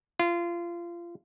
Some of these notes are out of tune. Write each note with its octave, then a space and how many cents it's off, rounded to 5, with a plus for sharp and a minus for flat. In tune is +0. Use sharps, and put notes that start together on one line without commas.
F4 -25